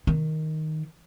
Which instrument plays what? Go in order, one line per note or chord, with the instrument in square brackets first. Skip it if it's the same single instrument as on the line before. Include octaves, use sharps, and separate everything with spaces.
[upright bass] D#3